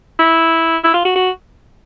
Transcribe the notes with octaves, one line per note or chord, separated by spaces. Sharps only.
E4
E4
F4
F#4
F#4